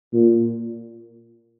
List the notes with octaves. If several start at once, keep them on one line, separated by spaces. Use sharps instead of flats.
A#2